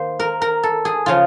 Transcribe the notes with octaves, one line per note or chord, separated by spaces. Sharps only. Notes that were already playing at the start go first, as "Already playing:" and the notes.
Already playing: D#3 A#3 C5
A#4
A#4
A4
G#4
C#3 F3 F4